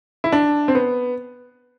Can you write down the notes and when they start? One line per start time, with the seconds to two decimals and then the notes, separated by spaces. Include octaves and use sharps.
0.24 E4
0.32 D4
0.68 C4
0.75 B3